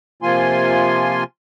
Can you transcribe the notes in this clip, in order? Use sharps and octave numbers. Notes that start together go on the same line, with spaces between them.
C3 F3 A#3 F4 G#5 C6